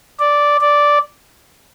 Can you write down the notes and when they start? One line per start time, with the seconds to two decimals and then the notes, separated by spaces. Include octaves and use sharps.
0.20 D5
0.61 D5